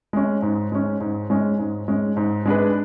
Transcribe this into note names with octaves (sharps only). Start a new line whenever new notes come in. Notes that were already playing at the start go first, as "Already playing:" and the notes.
G#3 C#4
G#2
G#3 C#4
G#2
G#3 C#4
G#2
G#3 C#4
G#2
G#3 D4 G#4 B4